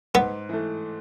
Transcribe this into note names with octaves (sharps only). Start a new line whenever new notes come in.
G#2 B3
E3 A3